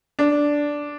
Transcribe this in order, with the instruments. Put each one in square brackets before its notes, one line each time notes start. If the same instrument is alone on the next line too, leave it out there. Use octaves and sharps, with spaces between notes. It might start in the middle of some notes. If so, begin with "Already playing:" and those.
[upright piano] D4